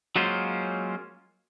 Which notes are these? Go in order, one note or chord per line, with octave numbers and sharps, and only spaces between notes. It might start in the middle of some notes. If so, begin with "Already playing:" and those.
F#3 G#3 A#3 C#4 F4 C5